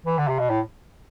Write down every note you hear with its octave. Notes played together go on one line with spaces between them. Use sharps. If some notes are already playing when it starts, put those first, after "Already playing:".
E3
D3
C3
B2
A2